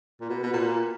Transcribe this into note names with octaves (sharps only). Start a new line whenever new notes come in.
A#2
B2
B2
A#2